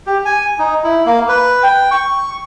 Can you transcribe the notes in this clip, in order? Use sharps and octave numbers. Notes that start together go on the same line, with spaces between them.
G4
G#5
D#4
E4
A#3
B4
G5
C#6